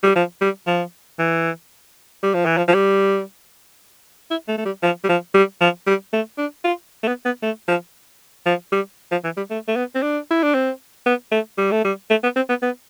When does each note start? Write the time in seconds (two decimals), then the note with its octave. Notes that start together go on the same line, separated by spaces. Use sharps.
0.03 G3
0.15 F3
0.41 G3
0.66 F3
1.19 E3
2.23 G3
2.34 F3
2.45 E3
2.57 F3
2.67 F3
2.74 G3
4.30 E4
4.48 A3
4.58 A3
4.65 G3
4.82 F3
5.04 G3
5.09 F3
5.34 G3
5.61 F3
5.86 G3
6.13 A3
6.38 D4
6.64 F4
7.03 A3
7.07 B3
7.25 B3
7.42 A3
7.68 F3
8.46 F3
8.72 G3
9.11 F3
9.24 E3
9.37 G3
9.50 A3
9.67 A3
9.76 B3
9.95 C4
10.02 D4
10.30 E4
10.43 D4
10.54 C4
11.06 B3
11.31 A3
11.58 G3
11.71 A3
11.84 G3
12.10 A3
12.23 B3
12.36 C4
12.49 B3
12.62 B3